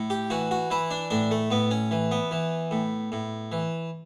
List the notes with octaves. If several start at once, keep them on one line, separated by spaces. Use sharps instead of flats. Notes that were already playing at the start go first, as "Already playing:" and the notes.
Already playing: A2
G4
E3 F#4
F#4
E3 E4
D4
A2 D4
A3
A2 B3
C#4
E3
B3
E3
A2
A2
E3